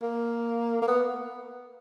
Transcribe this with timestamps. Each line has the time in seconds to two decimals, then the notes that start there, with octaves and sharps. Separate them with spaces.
0.03 A#3
0.82 A#3
0.88 B3